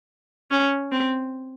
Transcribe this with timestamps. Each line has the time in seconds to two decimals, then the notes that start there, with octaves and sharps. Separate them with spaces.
0.51 C#4
0.91 C4